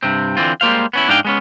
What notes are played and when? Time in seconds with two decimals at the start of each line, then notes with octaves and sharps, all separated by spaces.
0.03 G2 C3 C4
0.37 D3 E3 C4 F4
0.61 G3 G#3 A#3 C5 F5
0.93 B3 C#4 E4
1.08 G#2 D4 D#4 G#4 F5 G5
1.25 G#3 B3 C#4